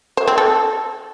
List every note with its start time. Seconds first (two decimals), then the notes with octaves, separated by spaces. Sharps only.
0.17 C5
0.28 C4
0.38 A4